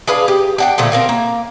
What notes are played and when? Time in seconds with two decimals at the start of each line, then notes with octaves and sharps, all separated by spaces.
0.08 D4 G#4 B4 F5
0.28 G4
0.58 D4 F#5 G5
0.78 A#2 D3 F3 A3
0.92 C4 A#4 F5
1.09 A#3